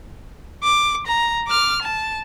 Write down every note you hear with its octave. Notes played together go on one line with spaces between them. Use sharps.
D6
A#5
D6 F6
A5